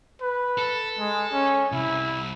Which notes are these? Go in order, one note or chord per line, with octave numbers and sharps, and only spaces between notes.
B4
A4
G#3
C#4
C2 E4